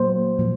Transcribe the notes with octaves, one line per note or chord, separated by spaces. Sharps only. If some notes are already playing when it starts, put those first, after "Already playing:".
Already playing: A#2 F#3 A#3 C5
A#2 F3 A#3